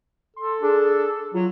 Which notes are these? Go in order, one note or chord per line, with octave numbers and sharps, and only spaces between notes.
A4 C6
D4 G#4
F#3 F4